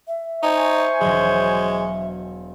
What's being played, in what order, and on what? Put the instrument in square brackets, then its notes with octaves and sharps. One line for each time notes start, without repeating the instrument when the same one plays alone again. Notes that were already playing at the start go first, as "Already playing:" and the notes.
[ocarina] E5
[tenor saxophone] D#4 [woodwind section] C5 G#5 C#6
[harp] E1 F#3 [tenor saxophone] G#3